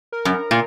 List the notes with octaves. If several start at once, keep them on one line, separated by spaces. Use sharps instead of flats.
A#4
F#2
A#2